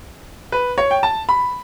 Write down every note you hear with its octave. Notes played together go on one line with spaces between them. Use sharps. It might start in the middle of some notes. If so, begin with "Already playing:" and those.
B4
C#5
G5
A5
B5